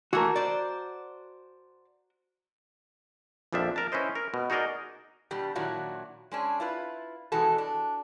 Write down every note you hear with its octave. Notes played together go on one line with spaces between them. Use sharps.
E3 A3 F#4 A#4
C5 D5
A#1 F2 F3 D4 E5
A#4 A5
C#4 E4 B4 C5 D#5
A#4
B2
D#4 F#4 G#4 A#4 D5 D#5
B2 G3 D4 G4
A#2 D#3 F#3 D4 E4 F#4
G#3 C#4 D4
E4 F4 B4
B2 E3 G#3 F#4 A4
D4